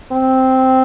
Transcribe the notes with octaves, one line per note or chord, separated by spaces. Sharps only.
C4